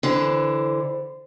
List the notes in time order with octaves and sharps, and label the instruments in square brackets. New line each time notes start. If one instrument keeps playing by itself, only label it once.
[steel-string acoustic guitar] D3 E3 [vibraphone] C5